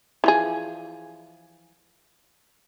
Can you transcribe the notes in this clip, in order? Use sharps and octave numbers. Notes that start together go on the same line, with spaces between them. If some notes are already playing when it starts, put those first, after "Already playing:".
E3 F3 G#4